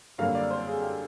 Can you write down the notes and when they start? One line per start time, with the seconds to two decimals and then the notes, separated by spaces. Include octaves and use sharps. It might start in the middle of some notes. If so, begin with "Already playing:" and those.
0.18 F#2 D3 G3 A#3 F5
0.35 D5
0.51 C5
0.67 G#4
0.83 G4